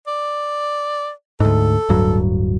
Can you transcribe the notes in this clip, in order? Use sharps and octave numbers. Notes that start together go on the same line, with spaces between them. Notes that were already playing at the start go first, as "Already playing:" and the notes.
D5
D2 G#2 A4
D1 G2 F#3